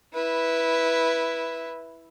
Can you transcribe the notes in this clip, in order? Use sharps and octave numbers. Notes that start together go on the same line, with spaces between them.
E4 B4